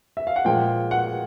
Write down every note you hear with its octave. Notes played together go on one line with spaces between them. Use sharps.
E5
F5
F#5
A#2 F3 G#3 G5
F#5